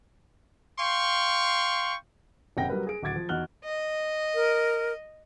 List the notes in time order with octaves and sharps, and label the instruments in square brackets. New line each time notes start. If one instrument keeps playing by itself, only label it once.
[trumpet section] F5 G5 C6 C#6
[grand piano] F#1 C3 F#5 G5 A#6
F#3 G3 A#4 B4
G#4 D7
D1 F#4 D6 G#6 A6 D7
F3
E2 D#4 F#4 F6 F#6 G7
[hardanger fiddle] D#5
[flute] A#4